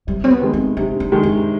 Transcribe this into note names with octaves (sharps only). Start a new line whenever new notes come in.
C3 G3
C4
B3
D#3 G#3
C4
C3 D4
D4
D#3 G#3
D4